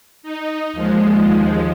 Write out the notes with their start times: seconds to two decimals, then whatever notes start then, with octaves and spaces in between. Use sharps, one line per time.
0.23 D#4
0.73 D#2 F3 G#3